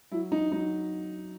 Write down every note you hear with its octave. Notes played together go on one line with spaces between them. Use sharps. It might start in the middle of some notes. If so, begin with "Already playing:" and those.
F#3 E4
D#4
F#3 D#4